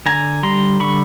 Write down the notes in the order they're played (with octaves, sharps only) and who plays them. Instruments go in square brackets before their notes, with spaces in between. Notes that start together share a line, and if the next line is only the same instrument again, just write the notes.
[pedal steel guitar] D3 G#5 A#5
G3 A#5 C6
D3 B5 C#6